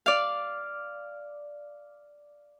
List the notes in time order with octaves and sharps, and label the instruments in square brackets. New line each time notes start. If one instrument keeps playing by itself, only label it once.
[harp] D5 F5